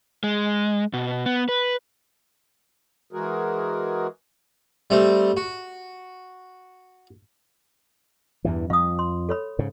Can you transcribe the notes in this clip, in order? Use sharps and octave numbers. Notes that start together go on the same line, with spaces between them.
G#3
B2
B3
B4
E3 G#3 F#4 G#4 A#4
G3 A3 C4
F#4
E2 G2 E3
F2 F5 D#6
C6
A4 C#5 B5
G#2 C#3